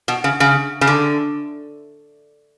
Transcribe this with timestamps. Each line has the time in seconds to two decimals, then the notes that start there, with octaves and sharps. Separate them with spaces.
0.08 B2
0.24 C#3
0.40 C#3
0.81 C#3
0.87 D3